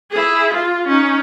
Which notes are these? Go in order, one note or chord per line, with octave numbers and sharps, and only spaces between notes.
E4 G#4
F4
C#4 D#4